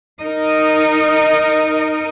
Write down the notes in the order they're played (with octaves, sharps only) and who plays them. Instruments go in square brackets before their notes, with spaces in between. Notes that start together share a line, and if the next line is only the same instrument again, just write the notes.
[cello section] D#4 A#4 D#5